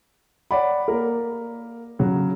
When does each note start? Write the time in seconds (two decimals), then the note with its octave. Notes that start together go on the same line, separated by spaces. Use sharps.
0.51 C#5 D5 F#5 B5
0.88 A#3 A#4
1.99 C#3 F#3